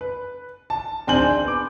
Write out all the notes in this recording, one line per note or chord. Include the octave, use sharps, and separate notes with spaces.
B4
A5
D1 C4 D4 G#5 G6 F#7
G6
B3 D6